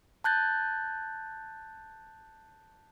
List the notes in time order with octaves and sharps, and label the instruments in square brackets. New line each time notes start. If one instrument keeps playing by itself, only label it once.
[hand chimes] A5 F#6 G6 A6